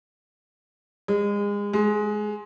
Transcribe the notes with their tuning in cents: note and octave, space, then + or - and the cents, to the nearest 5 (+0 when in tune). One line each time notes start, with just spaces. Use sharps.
G#3 -30
G#3 +15